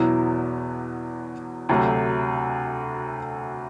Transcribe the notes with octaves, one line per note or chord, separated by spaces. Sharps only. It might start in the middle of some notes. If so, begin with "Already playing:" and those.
Already playing: E2 B2 F#3 B3 E4
D2 C3 F#3 A3